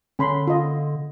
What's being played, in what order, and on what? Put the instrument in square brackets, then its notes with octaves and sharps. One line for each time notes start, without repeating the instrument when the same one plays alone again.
[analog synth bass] D3 [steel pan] C#4 B5 C6
[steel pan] F4 D#5